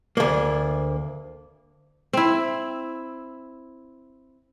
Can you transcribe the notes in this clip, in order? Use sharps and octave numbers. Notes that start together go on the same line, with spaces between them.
D2 A#3
C4 E4